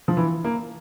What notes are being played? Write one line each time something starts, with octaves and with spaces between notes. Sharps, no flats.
F3
E3
A#3